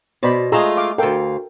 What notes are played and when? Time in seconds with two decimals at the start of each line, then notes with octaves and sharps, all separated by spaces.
0.23 B2 C5 D5 B5
0.52 G#3 A3 F4 G#4 A#5 E6
0.77 F5 D6
0.98 D2 A4 A#4 F5 G5